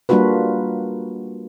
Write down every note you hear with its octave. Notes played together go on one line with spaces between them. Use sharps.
G3 A#3 D4 F4 F#4 B4